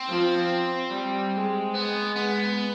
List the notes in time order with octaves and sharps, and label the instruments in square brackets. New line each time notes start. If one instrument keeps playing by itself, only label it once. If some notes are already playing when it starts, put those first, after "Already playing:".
Already playing: [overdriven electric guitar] C4
[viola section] F3
G3
G#3
[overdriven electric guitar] B3
B3